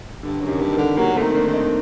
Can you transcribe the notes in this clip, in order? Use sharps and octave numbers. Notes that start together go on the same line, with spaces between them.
G2 D3
F#2
C3 D#3
G2
D#3 G3
D3
F#3 G3 A#3
A#3
D3 A3 C4
D#3
A#3 D4
D#3
C4 D#4